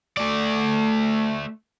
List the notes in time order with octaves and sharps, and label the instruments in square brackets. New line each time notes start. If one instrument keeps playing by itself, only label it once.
[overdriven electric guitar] A3 D5